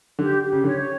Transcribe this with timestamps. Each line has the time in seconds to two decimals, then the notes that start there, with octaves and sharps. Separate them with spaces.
0.19 D3 G4
0.41 G4
0.52 C#3
0.63 D3 C#5